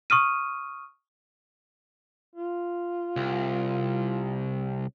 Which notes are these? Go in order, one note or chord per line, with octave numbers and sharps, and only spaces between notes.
C#6 D#6 F6 D#7
F4
C2